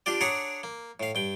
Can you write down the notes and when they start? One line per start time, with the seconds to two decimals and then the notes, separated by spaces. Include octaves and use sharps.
0.06 D4 F4 G4 D5
0.21 D4 G#4 C#5 D5 F#5 A#5
0.63 A#3
1.00 A2 F5
1.15 G2 G5